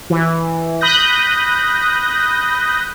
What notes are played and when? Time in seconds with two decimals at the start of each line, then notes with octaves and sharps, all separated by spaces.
0.10 E3
0.81 B5 D#6 F#6 G6 A#6